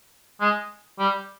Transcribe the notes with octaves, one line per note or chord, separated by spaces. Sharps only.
G#3
G3